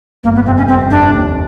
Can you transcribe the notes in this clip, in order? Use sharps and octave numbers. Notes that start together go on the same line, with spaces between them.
G1 A#3
B3
F2 C3 C4
C#4
G1 C4
F2 C3 D4
D#2